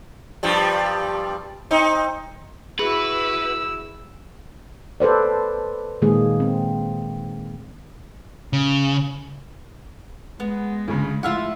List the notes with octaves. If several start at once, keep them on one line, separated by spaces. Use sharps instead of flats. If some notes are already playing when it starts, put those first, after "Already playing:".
G2 F3 G3
C4 D#4
E4 F#4 G#4 B4 E6
A4 B4 C5 D5
A#2 D#3 G#3 A#3 G#4
C4
C#3
G#3 B3
D2 C#3
A2 F3 F4 E5 F#5 F6